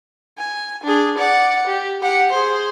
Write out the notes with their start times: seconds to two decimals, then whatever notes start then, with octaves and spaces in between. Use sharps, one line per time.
0.38 G#5
0.83 D4 G#4
1.18 D5 F#5
1.67 G4
2.01 G4 F#5
2.32 G#4 C5